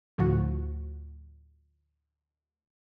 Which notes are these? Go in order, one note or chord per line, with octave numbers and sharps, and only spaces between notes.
D2 A2 F3 F#4